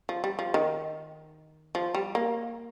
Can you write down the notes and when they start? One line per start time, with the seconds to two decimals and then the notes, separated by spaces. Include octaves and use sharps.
0.09 F3
0.24 G3
0.39 F3
0.54 D#3
1.75 F3
1.95 G3
2.15 A#3